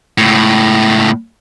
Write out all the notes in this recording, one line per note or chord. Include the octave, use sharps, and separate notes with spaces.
C#2 A2